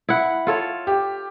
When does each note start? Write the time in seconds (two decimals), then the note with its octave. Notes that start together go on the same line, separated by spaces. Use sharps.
0.09 E4 F#5
0.47 F4 A4 C#5
0.87 G4